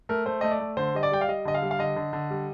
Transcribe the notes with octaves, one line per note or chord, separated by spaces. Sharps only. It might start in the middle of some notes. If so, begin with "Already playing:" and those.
A3 A#4
A3 C5
A3 D#5
D5
A3
D3 C5
G3 D#5
D5
G3 G5
F5
G3 D#5
D3 D#5
F5
G3
F5
D3 D#5
D3
D3
G3